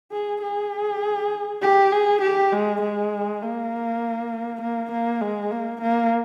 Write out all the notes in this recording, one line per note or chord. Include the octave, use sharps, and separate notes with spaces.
G#4
G#4
G4
G#4
G4
G#3
G#3
A#3
A#3
A#3
G#3
A#3
A#3